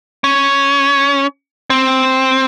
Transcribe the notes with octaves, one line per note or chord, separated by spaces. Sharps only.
C#4
C4